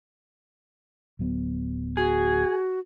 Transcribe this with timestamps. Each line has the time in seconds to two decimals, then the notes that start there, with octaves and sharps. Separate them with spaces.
1.19 D1 F#3 B3
1.97 F#4 G#4